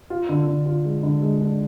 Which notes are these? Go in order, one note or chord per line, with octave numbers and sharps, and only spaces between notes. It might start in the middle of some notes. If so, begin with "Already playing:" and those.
F4
D3
D3
F4
G#3
D3
G#3
D4